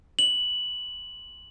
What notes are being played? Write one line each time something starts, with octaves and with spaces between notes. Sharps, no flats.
F#7